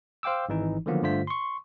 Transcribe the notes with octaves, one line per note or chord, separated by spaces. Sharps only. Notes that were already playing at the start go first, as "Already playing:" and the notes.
C5 F5 G5 D6 E6
G#1 E3 D#4
D3 D#3 F3 F#3 A#3 B3
G2 D3 A3 F4 C5 B6
C6 C#6